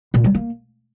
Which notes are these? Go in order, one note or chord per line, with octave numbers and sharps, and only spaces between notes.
A#2
G3
A#3